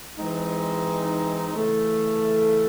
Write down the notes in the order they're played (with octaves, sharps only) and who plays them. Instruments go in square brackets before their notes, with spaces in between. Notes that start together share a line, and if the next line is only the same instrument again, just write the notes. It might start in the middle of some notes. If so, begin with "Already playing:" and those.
[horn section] E3 G#3 C4 D#4
C#3 E3 A3